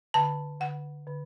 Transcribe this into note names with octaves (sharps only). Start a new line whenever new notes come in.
D3 A5
D3 F#5
D3